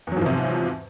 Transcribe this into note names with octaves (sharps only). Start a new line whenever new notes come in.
E2 G#2 C3 F3 F#3